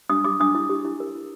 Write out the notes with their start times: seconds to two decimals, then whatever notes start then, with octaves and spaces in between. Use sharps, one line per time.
0.10 D4 D#6
0.24 G4 D6
0.40 D4 D#6
0.55 E4
0.70 G4
0.85 E4
1.00 A#4
1.15 E4